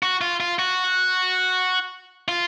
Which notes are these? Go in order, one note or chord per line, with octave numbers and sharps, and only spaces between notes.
F#4
F4
F4
F#4
F4